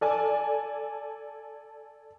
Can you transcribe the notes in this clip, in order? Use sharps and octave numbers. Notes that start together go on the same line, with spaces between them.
A4 D5 G#5 A5